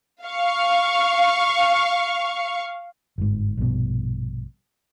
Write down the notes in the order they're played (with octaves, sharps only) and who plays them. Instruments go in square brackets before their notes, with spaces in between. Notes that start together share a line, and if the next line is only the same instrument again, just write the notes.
[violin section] F5 C#6
[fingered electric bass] G1 G#2
A#1 G2 B2